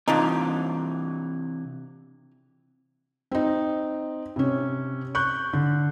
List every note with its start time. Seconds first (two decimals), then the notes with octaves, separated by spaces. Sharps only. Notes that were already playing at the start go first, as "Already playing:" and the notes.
0.08 C3 E3 F3 D4 D#4
3.31 C4 D#4
4.36 C3 C#4
5.15 C#6 F#6 G6
5.53 D3